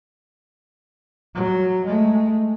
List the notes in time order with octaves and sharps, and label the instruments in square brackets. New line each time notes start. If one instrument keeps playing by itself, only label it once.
[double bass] F#3
G#3 A3